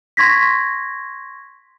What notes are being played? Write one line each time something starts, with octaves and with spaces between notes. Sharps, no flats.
C6 C#6 G#6 A#6 B6